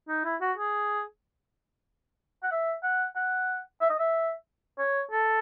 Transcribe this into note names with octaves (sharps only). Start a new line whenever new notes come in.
D#4
E4
F#4
G#4
F#5
E5
F#5
F#5
E5
D#5
E5
C#5
A4